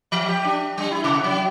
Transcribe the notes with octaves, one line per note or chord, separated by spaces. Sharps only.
F3
G4
D4
G3
E4
C3
F#3